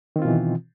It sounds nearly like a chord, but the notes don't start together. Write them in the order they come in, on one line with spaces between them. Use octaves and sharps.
D#3 C4 F4 B2 E3